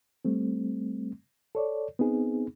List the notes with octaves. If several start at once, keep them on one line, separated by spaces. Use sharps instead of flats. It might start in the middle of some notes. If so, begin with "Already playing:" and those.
G3 A3 C4
A4 C#5 D5
B3 C4 D#4 G#4